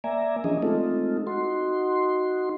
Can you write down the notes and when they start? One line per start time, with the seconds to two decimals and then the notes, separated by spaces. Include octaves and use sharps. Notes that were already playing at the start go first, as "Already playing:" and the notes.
0.04 A#3 D5 E5 G#5 A#5
0.44 E3 F3 C#4 D4 G#4 D#5
0.63 G#3 A3 C4 D#4 F4 A4
1.27 D#4 F#4 C6